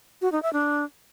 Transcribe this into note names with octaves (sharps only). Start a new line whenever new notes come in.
F#4
D#4
E5
D4